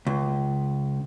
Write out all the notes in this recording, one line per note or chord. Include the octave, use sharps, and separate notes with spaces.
C#2